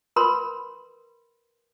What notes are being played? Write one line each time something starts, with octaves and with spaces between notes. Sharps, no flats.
A#4 B4 B5 C6